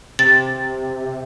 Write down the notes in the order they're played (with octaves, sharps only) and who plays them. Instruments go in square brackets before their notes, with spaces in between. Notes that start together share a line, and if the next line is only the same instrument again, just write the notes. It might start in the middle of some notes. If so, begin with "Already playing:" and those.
[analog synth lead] C3 [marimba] A6